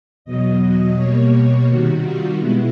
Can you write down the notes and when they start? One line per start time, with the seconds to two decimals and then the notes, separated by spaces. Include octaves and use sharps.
0.25 E2 B2 F#3 D#5
0.60 D#5
0.96 B2 G3 A#3 C#5
1.67 C3 D#3 G3 F#4
2.02 F4
2.37 B2 G#3 B3 E4